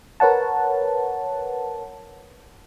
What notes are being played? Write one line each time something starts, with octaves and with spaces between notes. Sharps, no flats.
A#4 B4 C#5 F#5 A5